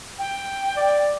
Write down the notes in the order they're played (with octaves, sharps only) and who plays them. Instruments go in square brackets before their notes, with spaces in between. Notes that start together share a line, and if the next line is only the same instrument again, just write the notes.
[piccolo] G5
[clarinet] D5